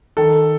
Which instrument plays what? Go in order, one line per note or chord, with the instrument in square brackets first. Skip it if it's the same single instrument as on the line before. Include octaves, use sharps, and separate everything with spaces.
[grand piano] D#3 A4